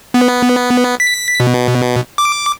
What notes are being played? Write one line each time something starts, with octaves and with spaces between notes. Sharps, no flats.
B3
B6
B2
D6